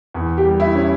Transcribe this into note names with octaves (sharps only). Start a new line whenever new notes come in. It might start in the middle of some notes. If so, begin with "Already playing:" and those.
E2
G4
G3
E4
C#4